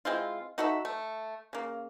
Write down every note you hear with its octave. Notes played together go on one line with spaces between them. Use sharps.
G#3 C4 E4 F4
D#4 F#4 A4 E5
A3
C#3 A#3